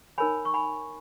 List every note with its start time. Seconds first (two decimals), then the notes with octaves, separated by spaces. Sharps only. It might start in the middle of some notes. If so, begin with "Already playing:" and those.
0.18 D#4 A#4 C#5 G#5 B5
0.45 C#6
0.54 G#5 B5